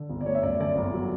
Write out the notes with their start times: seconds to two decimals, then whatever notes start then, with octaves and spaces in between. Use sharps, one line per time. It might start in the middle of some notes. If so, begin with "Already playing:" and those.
Already playing: D3
0.10 G1
0.21 D5
0.26 A3 C#5
0.35 E5
0.43 F#2 D5
0.60 D3 D5
0.76 G1
0.93 F#3